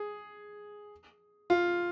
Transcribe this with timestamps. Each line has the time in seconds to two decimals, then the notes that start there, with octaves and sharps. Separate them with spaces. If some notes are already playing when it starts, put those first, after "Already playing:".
Already playing: G#4
1.50 F4